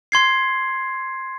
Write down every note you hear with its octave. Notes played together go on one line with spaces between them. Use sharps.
C6 G#6 C7